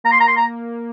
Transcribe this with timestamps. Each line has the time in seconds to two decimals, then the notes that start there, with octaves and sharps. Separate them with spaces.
0.04 A#3 A#5
0.12 C6
0.21 A#5
0.28 C6
0.37 A#5